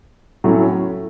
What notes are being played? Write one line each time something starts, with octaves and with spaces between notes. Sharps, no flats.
A2 F#3 A3 C#4 E4